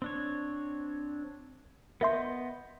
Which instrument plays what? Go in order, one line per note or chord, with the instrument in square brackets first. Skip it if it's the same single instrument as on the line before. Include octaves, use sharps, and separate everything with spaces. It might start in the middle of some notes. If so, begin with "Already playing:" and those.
[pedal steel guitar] C4 D4 C#5
[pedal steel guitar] B3 D#5 G6 [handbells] A#4 E5 C6